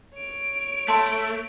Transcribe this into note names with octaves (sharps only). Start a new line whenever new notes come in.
C#5 D7
A3 A5 C6